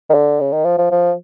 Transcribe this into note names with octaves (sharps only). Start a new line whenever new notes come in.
D#3
D3
C#3
D#3
F3
F3
F3